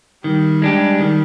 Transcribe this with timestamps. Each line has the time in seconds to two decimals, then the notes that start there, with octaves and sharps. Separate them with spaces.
0.24 D#3 G3
0.62 G#3 D4 G4
1.00 D#3